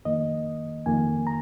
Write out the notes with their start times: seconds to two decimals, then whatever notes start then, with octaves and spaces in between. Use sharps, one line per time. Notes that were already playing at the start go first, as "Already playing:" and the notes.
0.05 F2 D#3 A#3 D#5
0.86 F2 D#3 A#3 G#5
1.27 A#5